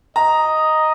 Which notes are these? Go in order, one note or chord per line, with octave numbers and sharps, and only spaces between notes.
D#5 A#5